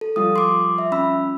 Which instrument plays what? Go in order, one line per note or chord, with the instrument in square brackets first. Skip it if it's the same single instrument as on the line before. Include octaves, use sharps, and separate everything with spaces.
[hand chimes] A4
[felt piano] F3 G3 F4 [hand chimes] D#6
[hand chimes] C6 D6
E5
C#4 B5 E6